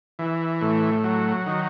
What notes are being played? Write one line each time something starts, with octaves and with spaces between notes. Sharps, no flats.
E3
A2
F#3
D#3